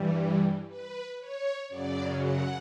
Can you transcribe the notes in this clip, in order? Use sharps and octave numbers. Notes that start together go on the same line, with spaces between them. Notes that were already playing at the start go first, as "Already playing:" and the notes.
Already playing: G2 E3 G3
B4
C#5
F#2 C#3 F#3 D5
F#5